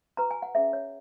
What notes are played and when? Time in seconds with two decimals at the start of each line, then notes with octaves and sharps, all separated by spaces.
0.17 F#4 B4 A#5
0.31 G#5
0.42 F#5
0.55 C#4 G#4 C#5 E5
0.73 C#5